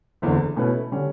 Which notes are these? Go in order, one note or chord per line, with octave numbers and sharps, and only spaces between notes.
F#1 E2 D3
B2 A3 C#4 E4 B4
D3 G3 C#4